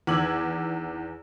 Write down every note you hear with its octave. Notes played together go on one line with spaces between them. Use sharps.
E2 D#3 D6 E6 G#6 F#7